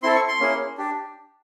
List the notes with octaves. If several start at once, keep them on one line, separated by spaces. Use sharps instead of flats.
C4 E4 A4 C6
C#6
C6
A#3 C#4 E4 G#4
D4 G4